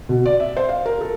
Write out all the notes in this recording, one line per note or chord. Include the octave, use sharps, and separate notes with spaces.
B2
D5
E5
C5
F5
A#4
A4